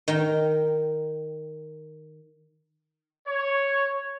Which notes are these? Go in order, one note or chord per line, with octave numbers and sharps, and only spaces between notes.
D#3 A#4 G5
C#5